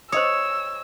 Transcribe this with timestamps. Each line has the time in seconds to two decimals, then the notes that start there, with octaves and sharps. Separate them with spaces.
0.12 C5 C#5 D#5 D#6 E6